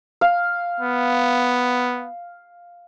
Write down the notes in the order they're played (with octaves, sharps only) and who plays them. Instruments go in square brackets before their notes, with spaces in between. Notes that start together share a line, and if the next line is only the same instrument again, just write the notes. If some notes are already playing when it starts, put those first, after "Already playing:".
[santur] F5
[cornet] B3